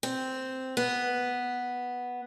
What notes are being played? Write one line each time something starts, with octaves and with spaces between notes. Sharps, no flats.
C4
B3